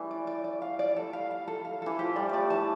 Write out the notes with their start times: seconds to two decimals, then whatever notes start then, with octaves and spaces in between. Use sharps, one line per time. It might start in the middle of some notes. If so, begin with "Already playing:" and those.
Already playing: E3 G3 A3
0.11 D5
0.27 D5
0.44 D5
0.62 F5
0.79 D5
0.96 A4
1.13 F5
1.31 F5
1.48 A4
1.65 F5
1.82 E3 A4
1.99 F3 G4
2.16 G3 D5
2.29 G3 A3 D5
2.50 E3 A5